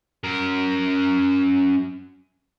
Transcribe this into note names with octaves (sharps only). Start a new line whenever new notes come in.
F#2 A#4